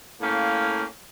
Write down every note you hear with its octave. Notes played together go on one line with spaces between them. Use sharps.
A2 A#3 C#4 F5 G5